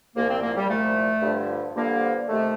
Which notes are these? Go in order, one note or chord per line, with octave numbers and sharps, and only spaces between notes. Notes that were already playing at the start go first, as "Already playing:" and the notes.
C2 A#2 F3 A#3
C4
A#3
G3
C2 A#2 F3 A3
G2 D3 F3
G2 D3 F3 A#3
C3 D#3 A3